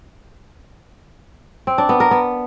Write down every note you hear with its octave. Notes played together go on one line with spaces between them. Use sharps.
C4
D4
B3
A#4
B3